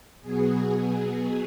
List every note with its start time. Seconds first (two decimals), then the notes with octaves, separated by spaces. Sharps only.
0.22 B2 F#3 B3 G#4
0.71 G#4